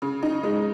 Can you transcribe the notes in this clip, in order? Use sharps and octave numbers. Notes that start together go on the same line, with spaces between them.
C#3
D#4
G#3